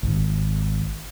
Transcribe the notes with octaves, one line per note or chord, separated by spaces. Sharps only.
G#1